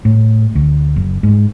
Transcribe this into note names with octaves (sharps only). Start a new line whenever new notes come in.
A2
D2
F#1
G#2